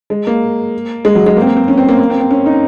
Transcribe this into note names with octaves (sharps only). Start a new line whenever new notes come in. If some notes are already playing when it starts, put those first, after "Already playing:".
G#3
A#3
G#3
F#3
G#3
A#3
C4
A#3
C4
C#4
C4
A#3
A#3
C4
C4
C#4
D#4